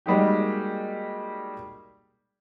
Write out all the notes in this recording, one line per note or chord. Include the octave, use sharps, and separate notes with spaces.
G3 G#3 A#3 D#4 F#4 G4